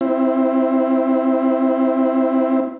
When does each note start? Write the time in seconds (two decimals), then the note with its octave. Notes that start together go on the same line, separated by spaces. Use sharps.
0.01 C4 E4